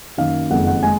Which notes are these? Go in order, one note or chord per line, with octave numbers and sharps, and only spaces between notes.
F#2 D#3 A#3 F5
F#1 F2 D#3 G#3 F#5
F#5
G#3 G#5